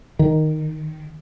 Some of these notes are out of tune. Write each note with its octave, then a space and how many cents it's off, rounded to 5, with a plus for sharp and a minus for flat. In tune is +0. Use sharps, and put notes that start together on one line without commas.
D#3 -5